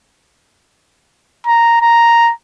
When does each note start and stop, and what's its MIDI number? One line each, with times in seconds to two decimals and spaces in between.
1.47 1.78 82
1.81 2.32 82